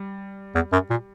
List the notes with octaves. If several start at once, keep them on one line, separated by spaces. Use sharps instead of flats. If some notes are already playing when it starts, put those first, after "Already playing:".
Already playing: G3
E2
F#2
A#2